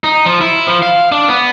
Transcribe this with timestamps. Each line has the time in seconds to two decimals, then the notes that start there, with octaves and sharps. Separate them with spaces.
0.04 D#4
0.26 F3
0.41 E4
0.67 F3
0.82 F5
1.12 D4
1.28 B3